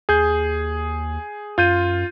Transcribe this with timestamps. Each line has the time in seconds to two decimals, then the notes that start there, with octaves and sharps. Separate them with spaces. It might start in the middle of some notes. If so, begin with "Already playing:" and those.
0.09 D#2 G#4 G6
1.58 F#2 F4 G6 D#7